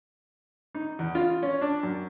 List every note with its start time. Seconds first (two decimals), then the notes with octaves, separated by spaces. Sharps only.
0.75 D#4
0.99 E2
1.15 F4
1.43 C#4
1.61 D4
1.83 F#2